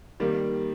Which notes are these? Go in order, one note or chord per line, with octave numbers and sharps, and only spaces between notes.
D#3 G3 A#3